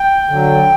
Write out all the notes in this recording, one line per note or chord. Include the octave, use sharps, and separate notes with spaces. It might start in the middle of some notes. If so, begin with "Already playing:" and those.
Already playing: G5
D3 F#3